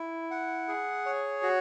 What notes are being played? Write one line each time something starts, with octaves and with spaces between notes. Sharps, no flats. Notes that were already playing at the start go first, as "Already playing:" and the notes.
Already playing: E4
F#5
G#4
C#5
F#4